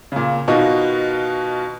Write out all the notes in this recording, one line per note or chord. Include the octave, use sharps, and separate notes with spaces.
A#2 C#3
B2 D#3 D#4 F4 F#4